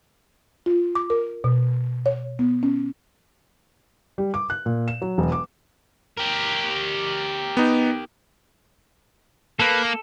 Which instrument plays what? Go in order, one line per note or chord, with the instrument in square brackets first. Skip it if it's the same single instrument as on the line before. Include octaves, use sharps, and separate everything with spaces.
[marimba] F4
D6
A#4
B2
C#5
B3
C#4
[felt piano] G3
D6
F#6
A#2
E7
F#3
E1
D6
[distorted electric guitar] G4 A#4
[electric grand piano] B3 D#4
[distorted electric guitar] A#3 [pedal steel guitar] A4 B4
[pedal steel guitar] A4